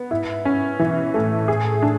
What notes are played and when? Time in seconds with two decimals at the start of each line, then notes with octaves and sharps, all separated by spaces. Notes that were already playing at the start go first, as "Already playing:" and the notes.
Already playing: B3
0.11 G#2 E4
0.45 C#4
0.79 B2 E3
1.14 A2 A3
1.48 G#4
1.83 D4